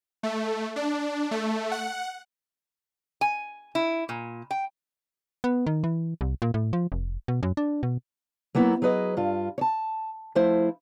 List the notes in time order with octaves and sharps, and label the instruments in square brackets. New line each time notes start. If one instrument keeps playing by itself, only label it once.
[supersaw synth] A3
D4
A3
F#5
[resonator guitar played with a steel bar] G#5
E4
A#2
G5
[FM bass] B3
D#3
E3
C2
A#2
A2
F3
F1
B2
F#2
D4
B2
[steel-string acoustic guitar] F#3 A#3 B3 E4
F#3 G#4 B4 D#5
G2 F4
C#5 A5
F3 A3 E4 C5